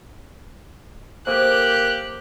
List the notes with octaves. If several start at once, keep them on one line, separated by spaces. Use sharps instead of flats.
A#3 G4 A4 A#4 C5 F#6